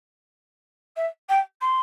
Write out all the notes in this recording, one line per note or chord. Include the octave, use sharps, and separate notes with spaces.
E5
G5
C6